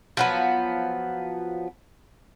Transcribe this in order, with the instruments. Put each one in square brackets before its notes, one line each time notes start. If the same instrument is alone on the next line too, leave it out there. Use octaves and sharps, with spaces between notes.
[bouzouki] F3 F#3 B3